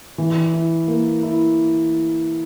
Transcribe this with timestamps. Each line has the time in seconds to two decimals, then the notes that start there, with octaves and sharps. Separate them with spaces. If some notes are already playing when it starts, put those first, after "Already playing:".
0.18 E3
0.54 E4
0.88 A#3
1.23 E4